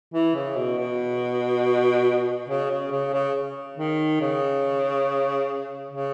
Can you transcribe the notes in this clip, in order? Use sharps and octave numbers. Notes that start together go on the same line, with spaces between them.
E3
C#3
B2
B2
C#3
C#3
C#3
C#3
D#3
C#3
C#3